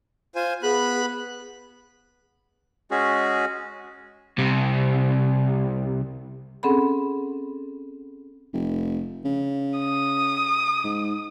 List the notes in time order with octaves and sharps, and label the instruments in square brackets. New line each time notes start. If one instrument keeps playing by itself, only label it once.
[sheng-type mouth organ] F4 C5 G#5
[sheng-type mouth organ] B3 B5 F#6 [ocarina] G#4
[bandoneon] G#3 C#4 F#4 G#4
[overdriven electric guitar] C2 C3
[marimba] C4 C#4 G#4 A4 F#5 B5
[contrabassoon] F1
C#3
[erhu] D#6
[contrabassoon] G#2